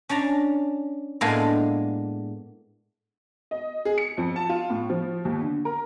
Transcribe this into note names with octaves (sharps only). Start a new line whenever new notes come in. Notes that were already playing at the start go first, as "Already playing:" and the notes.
C#4 D4 A5 A#5
A2 G#3 A#3 B3 D4 G#5
D#5
G#4
C#7
F2
A5
F4
A2
F3
D#2
D3
A#4